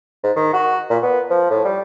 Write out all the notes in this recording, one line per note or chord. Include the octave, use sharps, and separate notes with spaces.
G#2
D#3
F#4
A#2
B3
F3
A2
G3